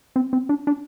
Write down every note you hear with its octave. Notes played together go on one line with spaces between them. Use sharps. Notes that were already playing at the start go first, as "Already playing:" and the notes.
C4
C4
D4
D4